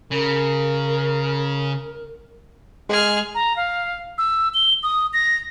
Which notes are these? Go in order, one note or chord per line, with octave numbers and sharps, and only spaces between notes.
C#3 A#4
G#3 G#4 F6
A#5
F5
E6
G7
D#6
A#6